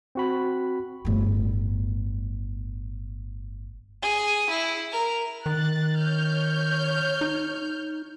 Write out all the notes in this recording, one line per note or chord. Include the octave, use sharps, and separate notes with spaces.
C4 F#4 B5
G1 A2
G#4
E4
A#4
D#3 F#6 A6
C#5 F6 G6
D#4